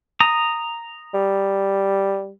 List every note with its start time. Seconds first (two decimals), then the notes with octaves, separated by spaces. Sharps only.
0.20 A#5 D#6
1.14 G3